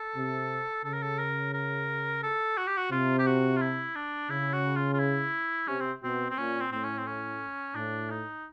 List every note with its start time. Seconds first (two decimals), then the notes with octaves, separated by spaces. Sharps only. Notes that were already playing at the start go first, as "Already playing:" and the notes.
Already playing: A4
0.15 C3
0.84 C#3 A4
0.93 A#4
1.03 A4
1.19 A#4
1.53 A#4
2.23 A4
2.57 F#4
2.67 G4
2.77 F#4
2.91 C3 F4
3.19 G4
3.26 F#4
3.57 F4
3.61 E4
3.95 D4
4.30 C#3 E4
4.53 F#4
4.76 F4
4.93 F4
4.99 E4
5.68 C3 C#4
5.80 C4
6.03 B2 C4
6.30 C4
6.38 A#2 C#4
6.60 C4
6.72 A2 C4
6.84 C#4
6.98 C4
7.06 C#4
7.75 A2 D4
8.10 D#4